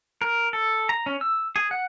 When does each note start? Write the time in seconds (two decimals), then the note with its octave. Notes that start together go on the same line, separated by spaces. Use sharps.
0.22 A#4
0.53 A4
0.89 A#5
1.06 C#4
1.21 E6
1.56 G#4
1.71 F#5